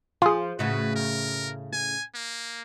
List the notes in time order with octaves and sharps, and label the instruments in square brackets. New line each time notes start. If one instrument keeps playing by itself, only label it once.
[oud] F3 [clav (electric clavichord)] F4 G#4
[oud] A2 C#3 F#4 [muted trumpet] B4
[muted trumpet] A#4
G#5
A#3